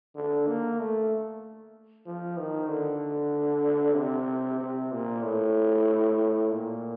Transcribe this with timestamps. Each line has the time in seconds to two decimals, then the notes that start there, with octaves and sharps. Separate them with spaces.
0.16 D3
0.47 A#3
0.79 A3
2.06 F3
2.38 D#3
2.69 D3
3.96 C3
4.60 C3
4.92 A#2
5.23 A2
6.50 A#2